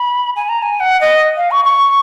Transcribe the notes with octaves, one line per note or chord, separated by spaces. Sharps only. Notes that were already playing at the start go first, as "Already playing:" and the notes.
Already playing: B5
G#5
A#5
G#5
F#5
D#5
F5
C#6
C#6